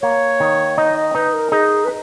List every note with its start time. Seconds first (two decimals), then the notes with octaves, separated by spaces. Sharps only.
0.02 A#3 C#5
0.40 D#3
0.78 D#4 D#5
0.96 D#5
1.15 D#4 B4
1.33 A#4
1.52 D#4 G#4
1.85 B4